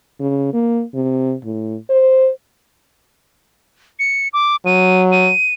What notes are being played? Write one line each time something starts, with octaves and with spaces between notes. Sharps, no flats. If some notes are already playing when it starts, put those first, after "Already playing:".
C#3
A#3
C3
A2
C5
C#7
D6
F#3 D#7
D#7